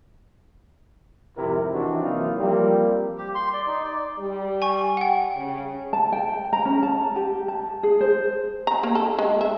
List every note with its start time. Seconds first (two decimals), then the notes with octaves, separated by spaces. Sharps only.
1.37 G#1 F2 C3 E4 G4 A#4
1.73 C3 E3 C4 D4 D#4 F#4
2.04 E3 F#3 A#3 D#4 F4
2.38 F3 G3 A#3 C4 G4 A#4
3.18 G4
3.35 C6
3.53 D5
3.67 D#4
3.84 D5
4.19 G3
4.62 G#5 C#6
4.97 F#5 G5
5.35 C#3
5.93 A5
6.12 G5
6.53 A#5
6.65 C#4
6.83 A5
7.16 G4
7.48 A5
7.83 G#4
8.01 C5
8.67 A#5
8.83 A#3
8.95 A4
9.19 G#3
9.41 E5